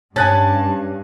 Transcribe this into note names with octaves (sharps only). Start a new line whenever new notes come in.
G2 C#4 G#5 A5 F#6 A6